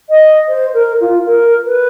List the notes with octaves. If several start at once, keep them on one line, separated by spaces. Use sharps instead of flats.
D#5
C5
A#4
F4
A#4
B4